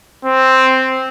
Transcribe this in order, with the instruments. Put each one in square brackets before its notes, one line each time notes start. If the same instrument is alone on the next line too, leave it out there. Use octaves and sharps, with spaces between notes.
[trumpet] C4